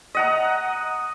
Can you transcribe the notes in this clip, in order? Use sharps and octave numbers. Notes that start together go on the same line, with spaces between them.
D#5 F#5 A#5